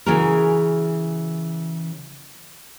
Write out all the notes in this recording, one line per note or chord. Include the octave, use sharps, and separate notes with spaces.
C#3 E3 C#4 F#4 G#4 A#4